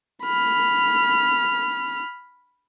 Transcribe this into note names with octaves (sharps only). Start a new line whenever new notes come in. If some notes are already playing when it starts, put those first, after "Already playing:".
B5 F6